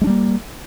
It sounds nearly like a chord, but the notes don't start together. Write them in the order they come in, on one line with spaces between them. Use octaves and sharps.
G#3 D4 G3 A#3